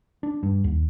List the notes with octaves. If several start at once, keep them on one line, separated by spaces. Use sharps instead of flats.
D4
G2
D#2